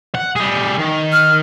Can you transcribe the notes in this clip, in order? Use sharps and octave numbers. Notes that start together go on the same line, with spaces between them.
F#5
G3 G#4
D#3
F6